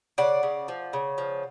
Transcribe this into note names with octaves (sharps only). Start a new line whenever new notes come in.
C#3 D5 F#5
C#3
F3
C#3
F3